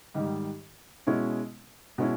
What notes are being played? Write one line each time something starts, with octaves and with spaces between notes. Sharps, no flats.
G#2 D#3 G3
B2 G#3 C#4 E4
B2 G#3 C#4 E4